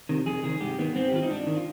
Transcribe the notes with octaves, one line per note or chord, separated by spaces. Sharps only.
C3 D#3
F2 G#4
C3 D#3 G#4
G#2 G4
D#3 B3
G#2 C4
G4
D#3 F4
D#4
G#2 D4
D#3
F4